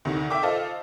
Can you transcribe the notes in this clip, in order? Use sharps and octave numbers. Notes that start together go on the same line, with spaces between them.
D2 C3 D#3
E5 G5 D6
F4 A4 C5 D#5